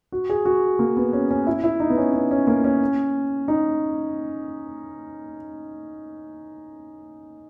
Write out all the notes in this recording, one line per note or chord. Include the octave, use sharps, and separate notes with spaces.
F#4
G#4
F#4
A#3
B3
C#4
C#4
E4
E4
D#4
B3
C#4
B3
C#4
A#3
C#4
D#4